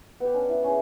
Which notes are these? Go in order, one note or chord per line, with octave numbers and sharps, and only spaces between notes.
B3 G4
C#4 D4
E4
C#4 G#4